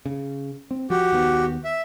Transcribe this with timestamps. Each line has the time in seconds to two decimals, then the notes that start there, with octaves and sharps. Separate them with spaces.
0.06 C#3
0.71 C4
0.90 F3 F#4 G4
1.11 D#2 D#3 B3
1.64 E5